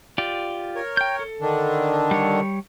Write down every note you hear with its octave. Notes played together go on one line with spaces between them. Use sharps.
F4 G4 D5
A#4 C#5
G5 G6
A4
D3 D#3 D4
G3 C#5